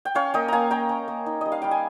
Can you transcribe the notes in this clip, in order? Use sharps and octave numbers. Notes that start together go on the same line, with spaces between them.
G5
C#4 C#5 F5
A#3 D#5 G5
A#3 F5 G#5 A#5
C#4 G5 A#5
C#4
A#3
D#4
G3 D#5
F5
G3 G5
G#5